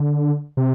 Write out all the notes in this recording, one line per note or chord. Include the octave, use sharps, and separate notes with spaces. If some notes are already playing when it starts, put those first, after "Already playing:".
Already playing: D3
C3